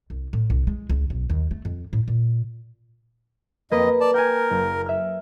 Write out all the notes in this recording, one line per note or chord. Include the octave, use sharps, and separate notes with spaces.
C2
A2
C2
G#3
C#2
B1
D#2
A3
F2
A2
A#2
F2 A#3 B4 D#5
D5 A5
A#4 G5 G#5
F#1
E5 F6